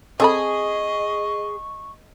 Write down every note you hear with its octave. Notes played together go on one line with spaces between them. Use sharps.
C4 G#4 A4 D#5 B5 C#6